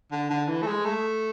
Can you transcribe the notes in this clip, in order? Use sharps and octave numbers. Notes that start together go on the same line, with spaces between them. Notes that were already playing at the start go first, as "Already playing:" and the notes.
D3
D3
E3
A3
G#3
A3